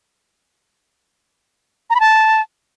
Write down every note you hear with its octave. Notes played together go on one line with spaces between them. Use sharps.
A#5
B5
A5